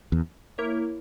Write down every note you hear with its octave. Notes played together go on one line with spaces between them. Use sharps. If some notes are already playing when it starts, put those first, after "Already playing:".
E2
A#3 E4 A#4 C#5